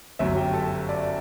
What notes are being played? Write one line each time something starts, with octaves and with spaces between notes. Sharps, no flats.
G1 F#2 F#3 E5
G4 G5
A4 A5
D5